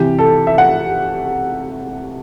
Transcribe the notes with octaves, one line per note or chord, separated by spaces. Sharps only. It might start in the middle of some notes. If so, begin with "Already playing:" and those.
Already playing: C3 E3 G4
A4
E5
F#5